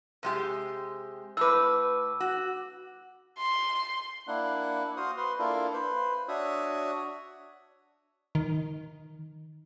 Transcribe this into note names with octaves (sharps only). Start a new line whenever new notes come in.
C3 G#3 G4
A2 B4 D6 E6
F#4
C6
A#3 D4 E4 F#5
F#4 C5 F5 D#6
B4 C6
A#3 D4 E4 F4 A4 A#4
B4 C5
D4 F#4 C#5 E5 D#6
D#3